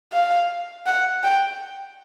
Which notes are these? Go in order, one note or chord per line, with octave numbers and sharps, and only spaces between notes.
F5
F#5
G5